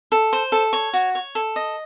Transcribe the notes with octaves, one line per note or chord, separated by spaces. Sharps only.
A4
C5
A4
C#5
F#4
C#5
A4
D#5